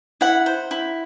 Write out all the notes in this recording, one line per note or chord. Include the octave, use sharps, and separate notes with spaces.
E4 F#5
C5
E4